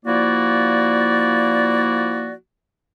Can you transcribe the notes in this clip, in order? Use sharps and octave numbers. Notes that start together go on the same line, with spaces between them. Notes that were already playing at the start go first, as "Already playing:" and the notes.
F3 A#3 E4 F#4 D5